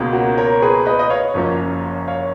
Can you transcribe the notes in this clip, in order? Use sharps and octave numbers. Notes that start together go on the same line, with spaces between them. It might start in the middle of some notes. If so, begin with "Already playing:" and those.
Already playing: C#2 B2 A#3
F#4 A#4
A#4 C#5
G#4 B4
B4 D#5
D#5
C#5 F5
F#1 F#2 F3 A#3 C#4
C#5 F5